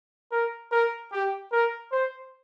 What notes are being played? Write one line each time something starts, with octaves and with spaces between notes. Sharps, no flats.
A#4
A#4
G4
A#4
C5